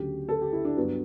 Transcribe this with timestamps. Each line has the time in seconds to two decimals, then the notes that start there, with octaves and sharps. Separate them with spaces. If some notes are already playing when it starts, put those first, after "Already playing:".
Already playing: D2 C#3 F#3 G4
0.29 A4
0.42 G4
0.53 E4
0.65 D4
0.77 G2 F#3 B3